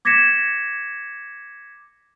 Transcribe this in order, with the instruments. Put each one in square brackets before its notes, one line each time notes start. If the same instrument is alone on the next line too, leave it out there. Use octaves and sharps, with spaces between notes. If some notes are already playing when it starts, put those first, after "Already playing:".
[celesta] D6 G#6 A#6 B6 C#7 E7